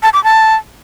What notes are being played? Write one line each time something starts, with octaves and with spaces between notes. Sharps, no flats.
A5
D6
A5